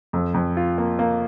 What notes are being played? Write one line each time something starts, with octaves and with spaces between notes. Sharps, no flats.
F2
F2
F4
A#3
A#3